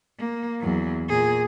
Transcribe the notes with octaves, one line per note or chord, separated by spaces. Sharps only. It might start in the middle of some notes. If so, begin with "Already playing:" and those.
A#3
E2 F#3
A#2 G#4